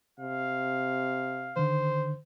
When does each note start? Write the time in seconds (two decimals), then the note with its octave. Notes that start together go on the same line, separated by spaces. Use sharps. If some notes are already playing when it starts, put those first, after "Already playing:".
0.20 C3 F5
1.57 D3 D#3 C5